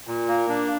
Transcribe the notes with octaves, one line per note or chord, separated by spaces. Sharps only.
A#2
A#3
D4